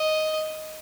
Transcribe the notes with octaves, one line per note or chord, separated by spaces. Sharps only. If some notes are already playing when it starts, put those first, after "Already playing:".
Already playing: D#5